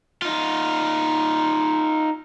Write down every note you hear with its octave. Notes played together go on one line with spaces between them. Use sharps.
D#4 F4